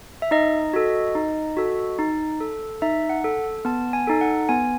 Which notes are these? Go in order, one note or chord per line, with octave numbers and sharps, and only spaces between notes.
E5
D#4 D#5
F#4 A4
D#4
F#4 A4
D#4
A4
D#4 E5
F#5
A4
B3 A5
G#5
D#4 A4
F#5
B3 G#5